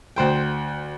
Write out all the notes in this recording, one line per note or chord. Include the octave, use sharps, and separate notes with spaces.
D2 C5 G5